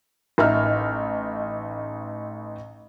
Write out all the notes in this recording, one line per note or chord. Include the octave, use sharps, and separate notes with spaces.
A1 D#4 E5 F6